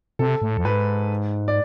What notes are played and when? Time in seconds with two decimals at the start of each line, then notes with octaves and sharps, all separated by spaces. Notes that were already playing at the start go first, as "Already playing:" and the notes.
0.19 C3 A4
0.42 A2
0.57 F2
0.65 G#2 B4
1.48 D5